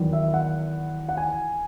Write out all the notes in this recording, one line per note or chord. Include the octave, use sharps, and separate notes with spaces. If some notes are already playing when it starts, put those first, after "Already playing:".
Already playing: E2 D#3 F#3
E5
E5
F#5
F#5
G#5